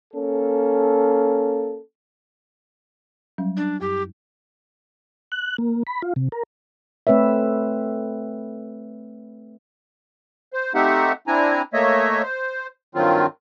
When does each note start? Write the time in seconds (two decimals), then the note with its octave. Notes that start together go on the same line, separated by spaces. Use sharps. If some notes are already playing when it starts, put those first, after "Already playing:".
0.14 A#3 C#4 A4
3.38 F#3 G3 C#4
3.57 D4
3.81 F#2 G4
5.32 F#6
5.58 A#3
5.87 B5
6.02 F4
6.16 C3
6.32 A#4
7.07 A3 C4 B4 C#5 E5
10.53 C5
10.75 A3 C4 D#4 G4 E5 F#5
11.27 C4 D4 E4 G#5 A#5
11.73 A3 A#3 C#5 D#5 E5
12.23 C5
12.95 G2 D#3 F#3 C4 F4